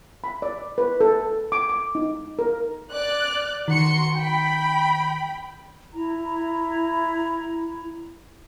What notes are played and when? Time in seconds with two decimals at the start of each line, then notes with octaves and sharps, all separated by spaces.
0.24 B5
0.42 D5
0.78 B4
1.01 A4
1.52 D6
1.70 D6
1.95 D#4
2.39 A#4
2.91 D5 F#6
3.68 D#3 F#4 C6 C#7
4.15 G5 B5
5.93 E4 A#5